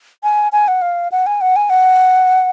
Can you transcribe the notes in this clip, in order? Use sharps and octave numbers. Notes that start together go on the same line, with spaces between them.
G#5
G#5
F#5
F5
F#5
G#5
F#5
G#5
F#5